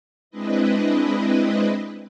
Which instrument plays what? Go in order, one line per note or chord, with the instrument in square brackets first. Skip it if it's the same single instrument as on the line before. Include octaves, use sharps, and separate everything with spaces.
[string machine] G#3 C4 D4 E4 B4 D#5